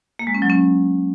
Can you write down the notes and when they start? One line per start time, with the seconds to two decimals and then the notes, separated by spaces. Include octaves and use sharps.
0.19 A#3
0.27 G#3
0.34 C#4
0.42 F#3
0.50 C#4